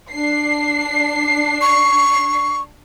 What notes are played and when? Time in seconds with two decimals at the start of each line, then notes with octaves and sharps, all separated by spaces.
0.12 D4 C7
1.61 C#6